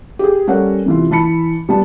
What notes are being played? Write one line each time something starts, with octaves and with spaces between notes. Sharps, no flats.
G4 G#4
G3 C#4 A4 A#4 C#5 F#5
C3 E3 F4
E3 A5 B5 C#7
G3 B3 A5